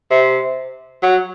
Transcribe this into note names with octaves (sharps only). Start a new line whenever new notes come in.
C3
F#3